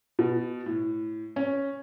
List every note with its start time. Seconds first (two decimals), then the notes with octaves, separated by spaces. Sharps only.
0.19 B2
0.66 A2
1.36 C#4